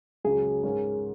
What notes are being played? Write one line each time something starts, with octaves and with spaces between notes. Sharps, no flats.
C#2 C#3 F#3 G#4
G#2 G#3 C#4 A#4